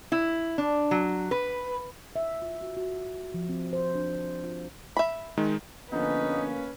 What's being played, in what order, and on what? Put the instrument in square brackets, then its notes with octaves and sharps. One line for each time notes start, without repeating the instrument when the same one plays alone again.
[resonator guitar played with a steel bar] E4
D4
F#3
B4
[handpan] E5
F4
F#4
F#4
F3
C4
C5
D4
F4
[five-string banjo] E5 B5
[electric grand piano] D#3 G#3 D#4
[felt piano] D3 F3 B3 [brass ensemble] A#3 C#4 [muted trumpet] D#4 [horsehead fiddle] B4